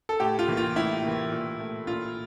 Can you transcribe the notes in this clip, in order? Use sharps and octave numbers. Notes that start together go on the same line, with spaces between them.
A4
A2 G4
F4
E3 A#3
F4
A2 E4
E3 A#3
A#2
A3
A#2 F4